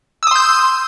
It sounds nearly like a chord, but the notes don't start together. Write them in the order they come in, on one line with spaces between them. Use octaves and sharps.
E6 D#6 C6 G6